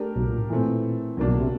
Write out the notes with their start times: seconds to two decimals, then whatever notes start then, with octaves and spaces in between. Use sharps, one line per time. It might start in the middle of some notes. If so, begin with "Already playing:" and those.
Already playing: A3 D4 G4 A#4
0.16 B1 B2
0.28 A#2
0.39 A2
0.50 A#2 E3 A3 C4
1.17 B1 B2 F#3 A#3 D4
1.28 B1 B2
1.39 C3